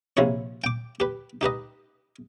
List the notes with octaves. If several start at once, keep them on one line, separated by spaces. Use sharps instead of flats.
A#1 C3 F3 E4 C#5
G5 D6
G4 B4
D#4 G4 B4 D#5